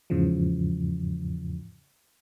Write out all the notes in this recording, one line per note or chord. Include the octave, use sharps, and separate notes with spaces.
E2 G#2 C#3 E3 F3